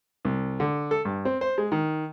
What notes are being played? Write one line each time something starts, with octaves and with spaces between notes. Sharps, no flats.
C2
D3
A4
G2
C4
C5
G#3
D#3